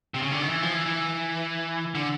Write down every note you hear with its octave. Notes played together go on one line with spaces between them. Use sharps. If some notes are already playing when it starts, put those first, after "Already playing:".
C3
C#3
D3
D#3
E3
F3
E3
E3
D3